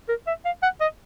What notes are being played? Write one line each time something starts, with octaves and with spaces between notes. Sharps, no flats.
A#4
E5
F5
F#5
D#5